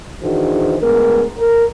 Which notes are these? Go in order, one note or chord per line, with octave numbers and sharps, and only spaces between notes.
D#3 E3 D4 F#4 G#4 C5
D2 G#3 B3 A#4
A#4